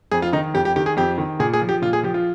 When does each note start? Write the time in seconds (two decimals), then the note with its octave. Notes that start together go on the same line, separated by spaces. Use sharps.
0.11 F2 G#4
0.22 F4
0.33 D#3 D#4
0.54 F2 G4
0.65 G4
0.76 D#3 G4
0.86 G#4
0.97 F2 G4
1.18 D#3
1.40 A#2 G#4
1.53 G#4
1.62 F3
1.69 G4
1.82 A#2 F4
1.93 G#4
2.03 F3 G4
2.14 F4